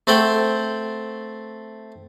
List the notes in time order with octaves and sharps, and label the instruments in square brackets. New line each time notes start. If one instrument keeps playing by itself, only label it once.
[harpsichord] A3 C4 A4 F#5 G5